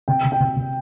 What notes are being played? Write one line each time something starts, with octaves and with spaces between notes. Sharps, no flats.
C3 G5
C3
G5
C3
C3